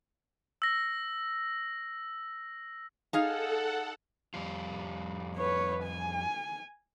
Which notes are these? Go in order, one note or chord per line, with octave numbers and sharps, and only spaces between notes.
E6 A#6
D#4 G#4 A4 F5 F#5
F2 G3 F4
B4 C#5
G#5